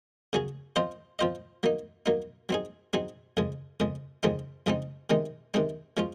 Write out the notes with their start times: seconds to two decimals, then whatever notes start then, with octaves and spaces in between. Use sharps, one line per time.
0.33 C#3 F#3 C#4 G#4
0.76 F3 C4 F4 C5 D#5
1.19 F3 C4 F4 C5 D#5
1.63 F#3 A#3 D#4
2.06 F#3 A#3 D#4
2.49 F#3 C4 D#4 G#4
2.93 F#3 C4 D#4 G#4
3.37 F2 C#3 G#3
3.80 F2 C#3 G#3
4.23 F2 C#3 G#3 C4 D#4
4.66 F2 C#3 G#3 C4 D#4
5.10 C3 D#3 G#3 C4 D#4
5.54 C3 D#3 G#3 C4 D#4
5.97 F3 G#3 C#4 F4